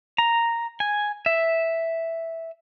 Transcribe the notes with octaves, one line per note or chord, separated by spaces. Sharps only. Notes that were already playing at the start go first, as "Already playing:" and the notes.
A#5
G#5
E5